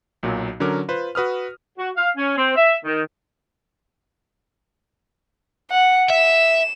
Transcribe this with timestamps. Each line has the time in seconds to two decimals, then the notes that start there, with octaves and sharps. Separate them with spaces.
0.23 B1 A#2 F#3
0.60 D3 F#3 C#4 A#4 D6
0.88 F4 B4 C5
1.15 F#4 B4 D#6 F6
1.78 F#4
1.97 F5
2.17 C#4
2.38 C4
2.56 E5
2.84 D#3
5.71 F#5
6.10 E5 E7